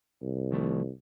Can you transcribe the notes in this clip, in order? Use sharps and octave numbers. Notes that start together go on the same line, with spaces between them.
C2
D#3 F3 A3